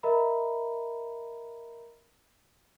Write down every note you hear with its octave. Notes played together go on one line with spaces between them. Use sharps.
A#4 D#5 E5 A#5 B5